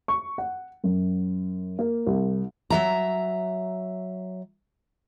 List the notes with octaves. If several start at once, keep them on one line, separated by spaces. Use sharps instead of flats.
C#6
F#5
F#2
A#3
C2
F#3 E5 A#5